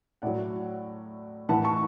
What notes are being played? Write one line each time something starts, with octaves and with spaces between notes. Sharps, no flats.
A2 F#3 D5 F#5
A2 E3 F#5 A5
A5 C#6